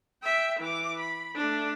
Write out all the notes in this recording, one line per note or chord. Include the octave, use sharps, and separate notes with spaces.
E5 G5
E3 D6
B5
A3 D4